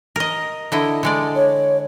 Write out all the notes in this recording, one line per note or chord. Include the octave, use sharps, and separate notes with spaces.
A#4 D#5
D3 E4 D#5
D3 G#3 D5
C#5